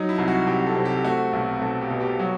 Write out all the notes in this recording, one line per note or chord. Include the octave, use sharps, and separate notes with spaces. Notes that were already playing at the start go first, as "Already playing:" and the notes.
Already playing: F#3 D#4
E4
C2
F#4
C2 G4
A4
C3
G4
A3 F#4
B1
B1 A4
G4
B2
G4
F#3 F#4